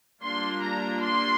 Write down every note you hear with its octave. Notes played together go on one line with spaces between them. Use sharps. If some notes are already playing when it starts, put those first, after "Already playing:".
G3 A#3 D4 F4 C6
A#5
C6